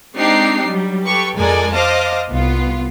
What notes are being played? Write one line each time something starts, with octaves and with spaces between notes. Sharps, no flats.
G#3 C4 D4 D#4 G4 C7
F#3 G3
G4 A4 B4 C#6
F2 G#3 A4 A#4 D5 G#5
C5 D#5 F5 A5 D6
C2 B3 F4